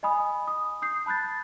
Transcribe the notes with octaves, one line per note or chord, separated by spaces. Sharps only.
D#5 G#5 B5 D#6
D#6
D#6 G6 C7
A5 B5 F#6 G6 A6